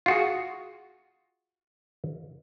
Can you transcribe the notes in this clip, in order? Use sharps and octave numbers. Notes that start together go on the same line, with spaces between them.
F4 F#4 G#4